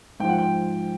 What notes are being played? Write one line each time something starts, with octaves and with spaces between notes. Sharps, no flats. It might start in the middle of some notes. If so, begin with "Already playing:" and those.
G#2 F3 G5
F#5
G5